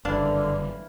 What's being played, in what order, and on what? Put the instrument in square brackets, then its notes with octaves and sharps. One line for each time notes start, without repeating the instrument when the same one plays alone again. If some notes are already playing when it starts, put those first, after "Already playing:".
[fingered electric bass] F#1 G2 [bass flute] D3 [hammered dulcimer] E3 F5 [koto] D4